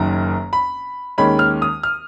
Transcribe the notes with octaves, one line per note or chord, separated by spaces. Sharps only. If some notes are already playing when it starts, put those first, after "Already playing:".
Already playing: F#1 F#2 D#3 A#5
B5
D#2 D#3 G#3 C#4 B5
F6
D#6
F6